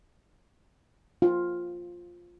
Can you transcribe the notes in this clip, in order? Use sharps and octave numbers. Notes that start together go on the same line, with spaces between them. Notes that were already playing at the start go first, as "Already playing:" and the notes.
F4